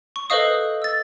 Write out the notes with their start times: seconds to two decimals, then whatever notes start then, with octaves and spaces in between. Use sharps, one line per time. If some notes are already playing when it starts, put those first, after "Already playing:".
0.16 C#6
0.30 A4 B4 C5 D#5 F5 D#6
0.82 E6 A6